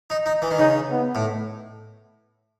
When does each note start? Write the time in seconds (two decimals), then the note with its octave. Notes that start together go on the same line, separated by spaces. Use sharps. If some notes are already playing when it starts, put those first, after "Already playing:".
0.10 D#4
0.26 D#4
0.42 E3
0.51 D#3
0.58 C#3 D#4
0.91 B3
1.15 A2